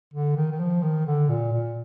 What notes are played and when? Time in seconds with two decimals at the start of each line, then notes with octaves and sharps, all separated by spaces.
0.14 D3
0.36 D#3
0.51 D#3
0.60 F3
0.83 D#3
1.06 D3
1.29 A#2
1.52 A#2